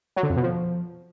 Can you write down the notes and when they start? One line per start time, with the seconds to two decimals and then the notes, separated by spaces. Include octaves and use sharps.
0.16 F#3
0.23 D3
0.30 F2
0.36 B2
0.43 F3